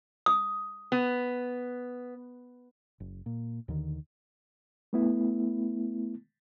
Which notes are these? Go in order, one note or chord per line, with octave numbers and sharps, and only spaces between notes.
D#6
B3
F#1
A#2
D#2 D3 D#3
A3 B3 E4